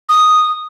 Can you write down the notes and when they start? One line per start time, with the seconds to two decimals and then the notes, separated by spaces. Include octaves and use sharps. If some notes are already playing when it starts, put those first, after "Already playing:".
0.09 D#6